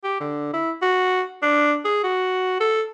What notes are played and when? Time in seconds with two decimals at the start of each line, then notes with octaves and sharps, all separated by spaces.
0.04 G4
0.21 D3
0.54 E4
0.82 F#4
1.43 D4
1.85 G#4
2.04 F#4
2.60 A4